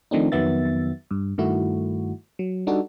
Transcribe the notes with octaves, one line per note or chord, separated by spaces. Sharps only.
D#3 F3 A3 C4 D4 D#4
F2 D#3 F#3 B3 E5 A6
G2
G2 D#3 A3 E4 F#4
F#3
G3 D4 D#4 F#4 A4